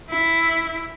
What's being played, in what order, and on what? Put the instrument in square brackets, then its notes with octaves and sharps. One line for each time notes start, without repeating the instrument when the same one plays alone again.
[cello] E4